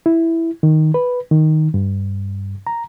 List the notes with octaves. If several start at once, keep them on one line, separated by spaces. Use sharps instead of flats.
E4
D#3
B4
D#3
G2
A#5